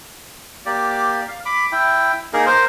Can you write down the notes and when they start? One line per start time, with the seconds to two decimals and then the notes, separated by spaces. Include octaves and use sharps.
0.66 A#3 G4 D5
1.28 F5
1.46 B5 D6
1.72 E4 G5
2.33 A#3 D#4 G#4 A#4
2.46 A#4 C5